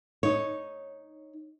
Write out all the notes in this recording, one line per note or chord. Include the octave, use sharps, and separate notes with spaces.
D#4 C#5